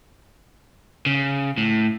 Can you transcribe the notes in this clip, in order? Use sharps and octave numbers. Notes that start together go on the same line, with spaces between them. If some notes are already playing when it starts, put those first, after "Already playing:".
C#3
A2